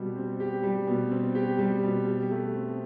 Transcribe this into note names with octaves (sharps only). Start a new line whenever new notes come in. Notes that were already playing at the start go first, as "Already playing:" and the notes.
Already playing: B2 G3 C4 G4
C4
G4
G3
B2
C4
G4
G3
B2
G4
A3
C4